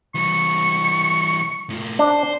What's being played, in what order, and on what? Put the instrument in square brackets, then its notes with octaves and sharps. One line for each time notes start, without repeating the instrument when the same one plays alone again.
[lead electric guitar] E3 G3 [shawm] C#6
[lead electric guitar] A2 F4
[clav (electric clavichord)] D4 [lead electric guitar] C5